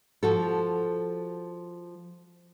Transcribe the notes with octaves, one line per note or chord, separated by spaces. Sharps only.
F3 F#4 A4